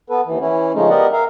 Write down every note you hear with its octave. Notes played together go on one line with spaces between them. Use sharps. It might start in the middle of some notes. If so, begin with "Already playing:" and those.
B3 A4 B4
D#2 E3
E3 C#4 E4
C#3 F3 G#3 A3 C#4 D#4
B3 G4 A#4 D5 D#5 F#5
A#4 E5 F5 A#5